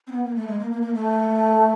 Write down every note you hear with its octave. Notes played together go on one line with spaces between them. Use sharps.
C4
B3
A#3
A3
G#3
A#3
A#3
A#3
A3